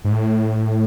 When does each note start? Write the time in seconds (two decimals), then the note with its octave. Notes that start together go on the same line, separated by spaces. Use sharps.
0.05 G#2
0.12 A2